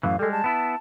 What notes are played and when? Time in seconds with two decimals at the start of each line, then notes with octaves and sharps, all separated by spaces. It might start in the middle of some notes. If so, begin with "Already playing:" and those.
0.03 F#2 A2 E3 F5
0.19 G3 G#3 A4
0.31 A5
0.44 B3 E4